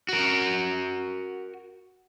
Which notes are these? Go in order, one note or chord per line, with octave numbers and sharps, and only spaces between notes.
F#4 A#4